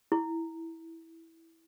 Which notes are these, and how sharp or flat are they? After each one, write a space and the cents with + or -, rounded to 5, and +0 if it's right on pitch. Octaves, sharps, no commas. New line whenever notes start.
E4 -10